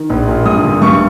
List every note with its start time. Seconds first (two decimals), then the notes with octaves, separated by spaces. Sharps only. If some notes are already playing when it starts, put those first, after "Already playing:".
Already playing: D#3
0.10 A#1
0.28 A#2
0.45 G2 D#6
0.64 D3
0.82 G2 C#6